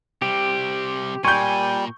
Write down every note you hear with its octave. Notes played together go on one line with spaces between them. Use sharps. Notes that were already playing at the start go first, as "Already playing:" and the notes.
C3 G3 G4
A#2 G3 G#5 C#6 G6